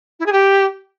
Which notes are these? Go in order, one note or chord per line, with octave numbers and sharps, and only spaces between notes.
E4
G#4
G4